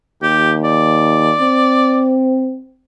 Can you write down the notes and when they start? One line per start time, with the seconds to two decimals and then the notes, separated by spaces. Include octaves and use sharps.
0.22 D#2 G4
0.64 D5
1.40 C4